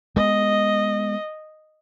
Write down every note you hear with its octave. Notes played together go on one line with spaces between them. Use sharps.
G#3 B3 D#5